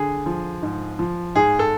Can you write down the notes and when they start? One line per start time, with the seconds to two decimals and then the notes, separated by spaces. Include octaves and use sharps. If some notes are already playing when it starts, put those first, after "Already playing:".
Already playing: D3 G#4
0.26 F3
0.63 G#2
0.99 F3
1.35 G#2 G#4
1.59 A4